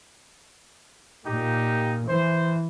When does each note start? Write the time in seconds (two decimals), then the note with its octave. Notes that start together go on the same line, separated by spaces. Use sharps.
1.25 A#2 D#4 G4
2.09 E3 C5